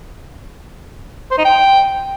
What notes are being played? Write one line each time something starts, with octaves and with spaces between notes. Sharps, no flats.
C5
D#4
G5